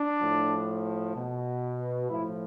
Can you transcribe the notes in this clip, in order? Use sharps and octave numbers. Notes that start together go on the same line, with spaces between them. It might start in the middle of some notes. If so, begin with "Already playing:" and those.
Already playing: D4
A2 F3
B2
A2 F3 E4